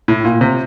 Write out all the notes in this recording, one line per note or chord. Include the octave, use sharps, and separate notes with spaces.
A2
A#2
C3